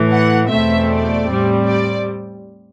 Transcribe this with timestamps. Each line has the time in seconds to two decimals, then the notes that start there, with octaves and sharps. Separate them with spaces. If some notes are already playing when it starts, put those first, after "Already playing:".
Already playing: A2 E3 A3
0.11 F#5
0.49 E2 B2 A3 C4 E5
0.89 D5
1.26 A2 G3 C4
1.66 D5